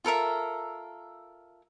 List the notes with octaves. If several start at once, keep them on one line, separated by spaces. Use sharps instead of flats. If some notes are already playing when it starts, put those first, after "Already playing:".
F4 A4 A#4 E5